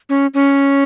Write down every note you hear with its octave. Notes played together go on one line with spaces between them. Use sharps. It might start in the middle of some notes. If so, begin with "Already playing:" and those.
C#4
C#4